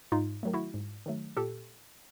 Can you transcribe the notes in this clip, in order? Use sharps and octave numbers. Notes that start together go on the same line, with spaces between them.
G#2 D#4 F4
D#3 F#3 A3
E4 F#4
G#2
D#3 F#3 A3
A#2 G4 A4